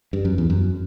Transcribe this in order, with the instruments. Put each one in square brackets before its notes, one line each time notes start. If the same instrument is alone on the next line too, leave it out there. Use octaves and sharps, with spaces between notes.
[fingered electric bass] G2
F#2
E2
F#2